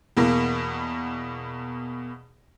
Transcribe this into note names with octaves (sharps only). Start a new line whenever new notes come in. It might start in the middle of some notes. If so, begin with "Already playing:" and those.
E2 B2 A#3